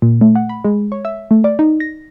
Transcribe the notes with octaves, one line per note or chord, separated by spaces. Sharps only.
A#2
A3
F#5
B5
G#3
C#5
E5
A3
D5
D#4
A#6